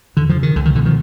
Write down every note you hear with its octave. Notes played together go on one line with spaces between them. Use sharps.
E2 D3
D#3 F3
C#3
D#3
C#2 D3
D#3
B2 D3 E3
D#3 F3